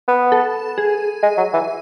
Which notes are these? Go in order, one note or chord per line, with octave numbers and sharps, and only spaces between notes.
B3
A4
G#4
G#3
F#3
E3